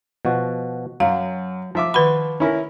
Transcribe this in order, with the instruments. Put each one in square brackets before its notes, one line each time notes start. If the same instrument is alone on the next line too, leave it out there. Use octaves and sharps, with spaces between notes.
[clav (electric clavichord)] B2 F3 F#4
[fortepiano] F#2 [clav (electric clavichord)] F#3 [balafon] F5
[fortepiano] F3 E5 D6
[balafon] D#3 B4 B5 [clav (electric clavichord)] F#4
[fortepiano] C#4 E4 A#4